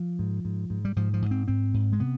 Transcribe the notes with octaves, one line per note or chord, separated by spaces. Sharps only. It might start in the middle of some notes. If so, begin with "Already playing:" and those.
Already playing: F3
G#2
G#2
G#2
G3
G#2 F3
F3
G#2
C4
G#2 C4
G#2
G#3
C3 B3